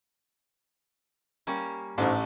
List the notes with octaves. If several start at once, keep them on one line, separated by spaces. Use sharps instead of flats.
G3 A#3 C#4
A1 G#2 A3 D4